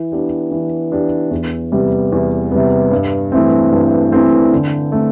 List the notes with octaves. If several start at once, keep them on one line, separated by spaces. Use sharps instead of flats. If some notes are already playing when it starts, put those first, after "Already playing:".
Already playing: E3
B3 D4 G4
E3
B3 D4 G4
E2
C3 G3 B3
E2
C3 G3 B3
G2
E3 A3 C4
G2
E3 A3 C4
D3
A3 C4